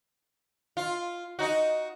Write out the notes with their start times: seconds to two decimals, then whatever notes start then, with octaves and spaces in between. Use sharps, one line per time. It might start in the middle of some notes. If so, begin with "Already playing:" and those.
0.77 F4
1.39 D#4 F#4